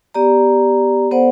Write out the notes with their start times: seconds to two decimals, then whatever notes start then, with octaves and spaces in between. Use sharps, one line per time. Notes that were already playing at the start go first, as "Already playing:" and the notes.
0.14 B3 G4 D5 A#5
1.11 B3 A4 C5 D5 F#5